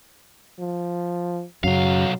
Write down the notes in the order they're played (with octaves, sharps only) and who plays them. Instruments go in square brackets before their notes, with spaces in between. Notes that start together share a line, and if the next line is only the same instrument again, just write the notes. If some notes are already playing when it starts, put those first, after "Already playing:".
[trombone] F3
[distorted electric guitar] B1 F5 [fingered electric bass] F#2 C#3 [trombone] F#3